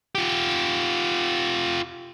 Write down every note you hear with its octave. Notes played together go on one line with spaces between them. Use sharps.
F4 G4